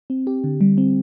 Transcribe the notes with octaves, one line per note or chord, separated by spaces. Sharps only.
C4
G4
D3
G3
C4